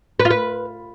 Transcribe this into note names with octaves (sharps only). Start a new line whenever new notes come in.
B4
F4
B4